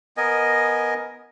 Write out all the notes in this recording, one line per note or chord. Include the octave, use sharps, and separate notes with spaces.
B3 A#4 D#5 G#5